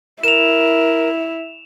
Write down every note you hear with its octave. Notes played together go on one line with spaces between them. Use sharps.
E4 A#4 E7 F7